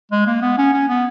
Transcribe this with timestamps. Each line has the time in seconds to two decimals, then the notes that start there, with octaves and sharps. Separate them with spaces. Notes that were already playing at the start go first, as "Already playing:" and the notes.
0.12 G#3
0.27 A#3
0.42 B3
0.58 C#4
0.73 C#4
0.88 B3